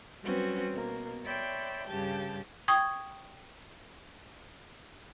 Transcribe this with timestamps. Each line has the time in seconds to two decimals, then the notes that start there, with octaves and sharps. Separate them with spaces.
0.22 F#3 G3 C4 C#4 F#4 B4
0.71 B2 A#3
1.23 C#5 D5 E5 G5 B5 C6
1.87 G2 C#3 G4 A5 G6
2.68 G5 C#6 D#6 G#6